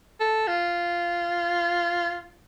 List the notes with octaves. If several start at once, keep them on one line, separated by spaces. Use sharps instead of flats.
A4
F4